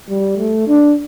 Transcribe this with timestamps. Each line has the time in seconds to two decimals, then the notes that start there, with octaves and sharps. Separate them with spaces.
0.10 G3
0.38 A3
0.68 D4